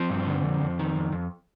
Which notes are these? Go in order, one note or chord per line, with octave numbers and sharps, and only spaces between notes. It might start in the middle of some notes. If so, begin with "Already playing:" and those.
Already playing: F3 C4
G2
D3
F2
F2
D#3
F2
F2